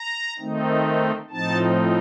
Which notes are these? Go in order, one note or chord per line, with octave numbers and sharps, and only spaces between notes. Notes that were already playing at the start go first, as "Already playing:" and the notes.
Already playing: A#5
D#3 A3 C4 D#4
A2 F3 C4 D#4 A5